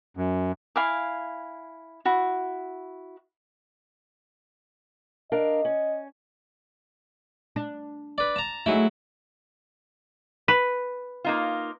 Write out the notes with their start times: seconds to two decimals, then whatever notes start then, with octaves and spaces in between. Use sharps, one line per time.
0.17 F#2
0.76 E4 F5 G#5 D6
2.05 E4 F#4
5.32 D4 A#4 D#5 F5
5.65 C#4
7.56 D4
8.18 B4 D5
8.36 A5 A#5
8.66 F#3 A3 D#4 E4 G#4
10.48 B4
11.24 A#3 D#4 F4